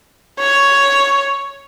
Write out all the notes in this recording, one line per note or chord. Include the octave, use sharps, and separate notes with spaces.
C#5